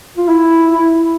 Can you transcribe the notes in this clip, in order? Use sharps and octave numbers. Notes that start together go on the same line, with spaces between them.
F4
E4